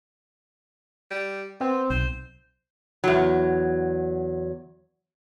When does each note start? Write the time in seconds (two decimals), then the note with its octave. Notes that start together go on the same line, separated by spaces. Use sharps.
1.11 G3
1.60 B3 C4
1.90 B1 C5
3.04 E2 F#3